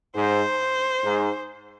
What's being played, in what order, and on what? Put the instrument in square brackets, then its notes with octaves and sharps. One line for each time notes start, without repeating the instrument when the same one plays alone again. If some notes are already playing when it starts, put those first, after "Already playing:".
[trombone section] G#2 [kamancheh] C5
[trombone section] G#2